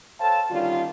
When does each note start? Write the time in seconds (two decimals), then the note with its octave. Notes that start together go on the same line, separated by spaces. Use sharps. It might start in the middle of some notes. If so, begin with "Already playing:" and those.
0.20 A4 C5 C#5 F5 G5 A5
0.51 G2 D3 D#3 G3 C#4 F4